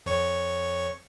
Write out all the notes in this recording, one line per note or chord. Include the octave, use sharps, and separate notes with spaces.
F2 C#5 C#6